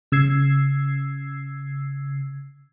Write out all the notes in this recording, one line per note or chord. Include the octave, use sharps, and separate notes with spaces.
C#3 E6 G#6 C7